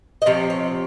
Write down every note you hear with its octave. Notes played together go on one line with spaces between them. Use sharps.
D#5
C3 F3 C4 C#5
C#5